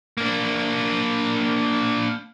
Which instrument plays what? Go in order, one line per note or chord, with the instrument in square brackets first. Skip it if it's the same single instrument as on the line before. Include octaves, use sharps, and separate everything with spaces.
[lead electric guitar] A#3 D4